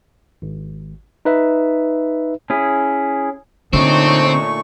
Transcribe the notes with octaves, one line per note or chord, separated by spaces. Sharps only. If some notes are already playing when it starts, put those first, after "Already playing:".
G#1
D#4 B4 E5
C#4 E4 G#4
A#2 D3 A3 C4 D4 D#4 C#5 C#6